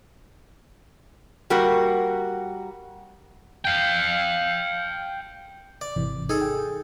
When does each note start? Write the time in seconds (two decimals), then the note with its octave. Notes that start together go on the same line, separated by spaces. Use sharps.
1.50 G3 A#3 F#4 A#4
3.65 F5 G5
5.81 D5
5.96 G#1 C3 E3
6.30 D#4 G#4 A4
6.41 G5